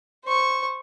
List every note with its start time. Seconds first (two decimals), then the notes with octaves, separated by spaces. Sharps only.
0.25 C5 C#6